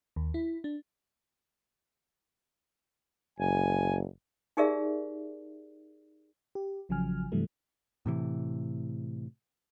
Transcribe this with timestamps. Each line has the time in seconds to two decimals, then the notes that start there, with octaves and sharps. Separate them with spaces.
0.16 D#2
0.34 E4
0.64 D4
3.39 F#1 G#5
4.57 D#4 G4 G#4 A#4 D5 E5
6.55 G4
6.89 A1 C#3 F3 F#3 G#5 F6
7.32 G2 C3 E3 F#3 G3 A3
8.06 A2 C3 E3